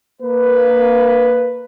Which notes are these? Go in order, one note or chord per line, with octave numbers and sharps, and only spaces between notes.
A#3 B4